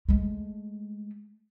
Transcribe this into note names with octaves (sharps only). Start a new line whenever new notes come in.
G#3 A3